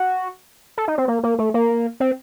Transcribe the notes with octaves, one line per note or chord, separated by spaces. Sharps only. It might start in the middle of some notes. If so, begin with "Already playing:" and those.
Already playing: F#4
A4
D#4
C4
A#3
A#3
A3
A#3
C4